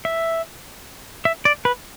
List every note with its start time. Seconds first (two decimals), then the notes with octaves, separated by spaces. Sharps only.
0.05 E5
1.25 E5
1.45 D5
1.65 B4